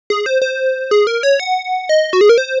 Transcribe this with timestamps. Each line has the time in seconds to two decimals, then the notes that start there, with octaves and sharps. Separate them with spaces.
0.10 G#4
0.26 C5
0.42 C5
0.91 G#4
1.07 A#4
1.23 C#5
1.40 F#5
1.89 D#5
2.13 F#4
2.21 G#4
2.29 A#4
2.38 C5